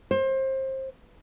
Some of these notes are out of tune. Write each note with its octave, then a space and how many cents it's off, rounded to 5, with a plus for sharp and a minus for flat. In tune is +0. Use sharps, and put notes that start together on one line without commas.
C5 +25